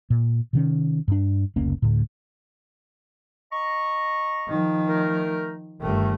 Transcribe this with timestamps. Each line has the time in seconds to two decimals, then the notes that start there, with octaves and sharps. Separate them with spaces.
0.10 A#2
0.53 C3 D#3 C#4
1.08 G2 D4
1.56 F1 C#2 A#3 C#4
1.82 D2 A2
3.52 D#5 A#5 C#6
4.47 D#3 F3
4.88 A3 D#4 A#4
5.81 G1 D#3 A3